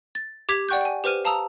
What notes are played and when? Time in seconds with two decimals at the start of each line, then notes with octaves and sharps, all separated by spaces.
0.15 A6
0.49 G4 D6 G#6 B6 F7
0.69 D5 F#5 G5 C#6 F#6 G6
0.81 G5 G#5
1.04 G4 B4 C5 F6 D#7
1.25 F5 A5 A#5 D#6 E6 F7